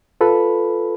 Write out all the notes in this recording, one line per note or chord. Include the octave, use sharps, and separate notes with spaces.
F4 A4 B4 B5